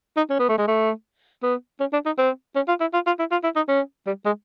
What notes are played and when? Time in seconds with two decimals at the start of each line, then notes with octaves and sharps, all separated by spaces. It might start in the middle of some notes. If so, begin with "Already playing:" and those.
0.17 D#4
0.30 C#4
0.39 B3
0.49 A3
0.58 G#3
0.68 A3
1.43 B3
1.80 C#4
1.93 D4
2.06 D#4
2.18 C4
2.56 C#4
2.68 F4
2.81 E4
2.94 F4
3.07 F4
3.19 E4
3.31 F4
3.44 E4
3.56 D#4
3.69 C#4
4.07 G3
4.26 G#3